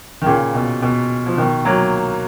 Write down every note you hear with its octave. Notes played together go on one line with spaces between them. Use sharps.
D#3
A#2 C#3
B2
B2
F3
B2 D#3
F#3 A#3